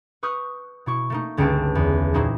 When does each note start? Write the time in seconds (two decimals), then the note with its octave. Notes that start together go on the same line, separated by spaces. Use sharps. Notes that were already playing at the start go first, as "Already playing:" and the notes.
0.23 B4 C#6 D#6 F6 G6
0.86 B2 E4 C#6
1.10 A3 A#3 D#4
1.37 G1 C#2 C4 C#4 G5 A5
1.75 E2
2.14 A#2 G#3 C4 D#4 E4 F#4